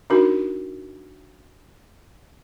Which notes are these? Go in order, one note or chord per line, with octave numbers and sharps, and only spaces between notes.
D4 D#4 F#4 A#4